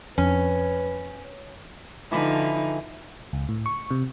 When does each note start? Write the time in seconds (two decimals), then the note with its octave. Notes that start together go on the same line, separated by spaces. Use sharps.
0.18 F2 C#4 B4
2.11 D3 E3 F3 D#4 B5 D6
3.33 C#2
3.49 A2
3.66 C#6
3.91 C3